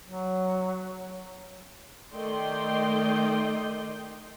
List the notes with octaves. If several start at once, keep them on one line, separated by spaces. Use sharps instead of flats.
F#3
D#3 A3 D5 D#5 G5 C6